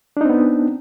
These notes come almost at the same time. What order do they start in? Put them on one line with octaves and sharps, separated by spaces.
D4 D#4 C4 B3